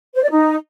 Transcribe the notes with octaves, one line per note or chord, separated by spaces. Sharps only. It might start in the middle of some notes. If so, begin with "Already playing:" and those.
C5
D5
D#4